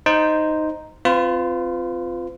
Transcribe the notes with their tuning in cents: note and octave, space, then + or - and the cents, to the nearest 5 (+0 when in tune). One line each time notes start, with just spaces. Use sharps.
D#4 +0 C5 -5
C4 +0 F4 +0 B4 +40